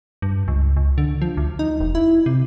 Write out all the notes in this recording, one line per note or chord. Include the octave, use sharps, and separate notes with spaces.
G2
C#2
C#2
D3
F3
D2
D#4
E1
E4
C3